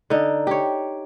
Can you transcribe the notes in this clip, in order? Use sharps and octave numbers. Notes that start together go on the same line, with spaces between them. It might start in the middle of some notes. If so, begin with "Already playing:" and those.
D3 D#4
G4 C#5